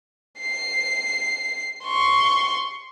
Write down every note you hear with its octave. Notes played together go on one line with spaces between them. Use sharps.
C7
C6 C#6